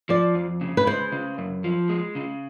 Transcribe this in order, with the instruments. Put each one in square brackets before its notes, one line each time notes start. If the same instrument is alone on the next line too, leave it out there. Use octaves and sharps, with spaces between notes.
[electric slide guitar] F3 [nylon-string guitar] D5
[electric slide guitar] F2
C#3
[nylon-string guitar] B4
[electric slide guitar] G#3 [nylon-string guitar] C5
[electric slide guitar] C#3
F#2
F3
G#3
C#3